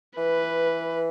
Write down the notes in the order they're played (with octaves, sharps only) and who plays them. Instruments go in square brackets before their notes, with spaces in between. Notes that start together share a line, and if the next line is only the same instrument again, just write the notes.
[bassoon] E3 [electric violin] B4